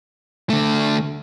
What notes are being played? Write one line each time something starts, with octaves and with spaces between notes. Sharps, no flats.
D3 A3